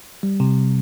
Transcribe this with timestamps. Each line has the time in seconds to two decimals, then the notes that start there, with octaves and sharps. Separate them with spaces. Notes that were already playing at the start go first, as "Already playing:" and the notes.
0.23 G3
0.40 C3